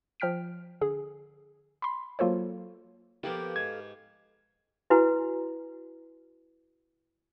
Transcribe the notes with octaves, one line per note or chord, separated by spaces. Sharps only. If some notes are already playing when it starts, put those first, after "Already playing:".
F3 G5 F6 B6 D7
D3 G#4
B5 C6
F#3 A#3 F4 A4 C5 C#5
F3 A#3 B3 G4 A4 B4 F5
G#2 G#6
E4 F#4 B4 G#5